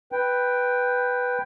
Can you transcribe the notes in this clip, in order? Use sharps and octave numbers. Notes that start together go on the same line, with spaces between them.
B4 G5